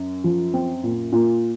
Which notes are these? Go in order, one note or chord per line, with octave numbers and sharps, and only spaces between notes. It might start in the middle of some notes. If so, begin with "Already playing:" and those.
Already playing: F#2
F3
C4
A#2
A#2